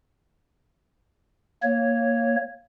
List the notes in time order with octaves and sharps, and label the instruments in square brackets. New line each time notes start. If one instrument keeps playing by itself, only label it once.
[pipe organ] A#3 C#5